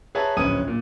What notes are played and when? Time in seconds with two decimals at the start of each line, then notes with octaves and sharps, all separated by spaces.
0.15 G#4 B4 C#5 E5 A5 A#5
0.37 D1 A#1 C#4 B4 D#6 D#7
0.68 A#2